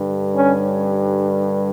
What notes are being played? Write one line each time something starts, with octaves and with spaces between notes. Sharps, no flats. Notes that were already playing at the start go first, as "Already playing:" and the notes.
Already playing: G2 D3 G3
C#4